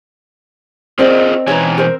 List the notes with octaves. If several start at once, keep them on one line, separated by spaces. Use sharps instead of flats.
C4 F4 G#4 A#4 C5 D5 D#5
B2 E3 D#4 B4 C#5 G#5
A#4 C5